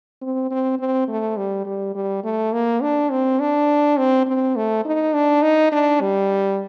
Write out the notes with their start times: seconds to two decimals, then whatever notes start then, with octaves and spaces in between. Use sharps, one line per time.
0.21 C4
0.51 C4
0.79 C4
1.08 A3
1.37 G3
1.66 G3
1.95 G3
2.24 A3
2.53 A#3
2.82 D4
3.11 C4
3.40 D4
3.97 C4
4.26 C4
4.56 A3
4.85 D#4
5.14 D4
5.42 D#4
5.72 D4
6.01 G3